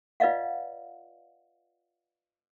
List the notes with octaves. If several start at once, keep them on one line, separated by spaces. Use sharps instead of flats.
F4 B4 D5 D#5 F5 F#5